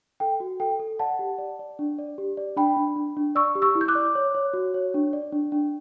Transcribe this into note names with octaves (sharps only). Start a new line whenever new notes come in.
A4 G5
F#4
A4 G5
A4
D5 F#5 A5
G4
D5
D5
D4
D5
G4
D5
D4 G5 B5
D4
D4
D4
D5 C#6 E6
G4
C#6 E6
E4
G6
D6 F#6
D5
C#5
C#5
F#4
C#5
D4
D5
D4
D4